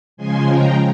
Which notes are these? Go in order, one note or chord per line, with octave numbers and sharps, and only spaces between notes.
C#3 F3 G#3 G#5 C6
G5 A#5